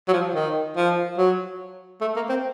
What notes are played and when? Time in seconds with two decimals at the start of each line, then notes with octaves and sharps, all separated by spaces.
0.08 F#3
0.13 F3
0.35 D#3
0.76 F3
1.18 F#3
2.01 A3
2.16 A#3
2.29 C4